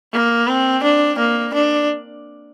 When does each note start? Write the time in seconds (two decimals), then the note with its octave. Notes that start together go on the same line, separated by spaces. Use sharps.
0.13 A#3
0.48 C4
0.83 D4
1.19 A#3
1.54 D4